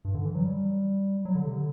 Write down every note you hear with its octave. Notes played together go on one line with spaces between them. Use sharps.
G2
D3
E3
F#3
G3
F#3
D3
C3
D3